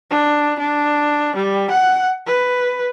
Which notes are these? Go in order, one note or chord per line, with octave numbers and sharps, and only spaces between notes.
D4
D4
G3
F#5
B4